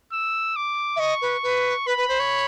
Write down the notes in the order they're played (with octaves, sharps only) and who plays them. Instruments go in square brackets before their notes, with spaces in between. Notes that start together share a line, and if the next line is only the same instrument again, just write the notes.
[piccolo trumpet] E6
D6
[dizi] E5
[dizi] D#5 [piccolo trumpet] C#6
[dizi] B4
B4
[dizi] B4 [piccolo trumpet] B5
[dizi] B4
C5
C#5